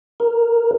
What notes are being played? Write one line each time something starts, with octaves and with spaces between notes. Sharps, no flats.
A#4